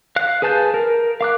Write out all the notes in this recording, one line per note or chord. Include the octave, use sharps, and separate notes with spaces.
F5 F#6
G#4 B4 G#5 A5 G6
A#4
F5 D6 F#6